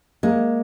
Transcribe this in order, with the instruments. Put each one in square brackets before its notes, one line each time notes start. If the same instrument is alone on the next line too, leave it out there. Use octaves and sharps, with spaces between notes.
[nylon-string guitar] G#3 [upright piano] A#3